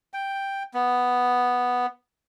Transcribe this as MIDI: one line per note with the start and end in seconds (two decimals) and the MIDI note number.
0.14 0.63 79
0.74 1.86 59